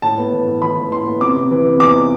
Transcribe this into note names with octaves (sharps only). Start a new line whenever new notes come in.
A2 A5
B3
E3
A2
E3 B5
E3
A2 C6
B3
C3 D6
C3
E3
C3
E2 D6